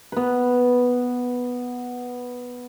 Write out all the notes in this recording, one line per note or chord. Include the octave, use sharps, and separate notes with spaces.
B3 B4